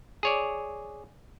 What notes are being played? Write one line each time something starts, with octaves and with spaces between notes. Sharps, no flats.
G#4 C#5 D5